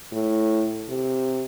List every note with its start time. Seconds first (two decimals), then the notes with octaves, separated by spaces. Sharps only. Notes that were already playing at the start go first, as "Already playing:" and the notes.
0.12 A2
0.89 C3